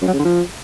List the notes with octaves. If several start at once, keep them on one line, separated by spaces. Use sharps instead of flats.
F#2
F#3
C#3
D3
F3